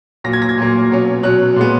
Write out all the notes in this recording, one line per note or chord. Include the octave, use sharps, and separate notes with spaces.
A#2 F#3 A#3 A#6
G#6
A#6
G#6
A#2 F#3 A#3
B2 F#3 C#4
B2 F#3 C#4 F#6
A#2 G#3 B3